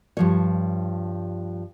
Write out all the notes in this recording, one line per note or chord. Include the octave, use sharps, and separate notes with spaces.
G2 F3 C#5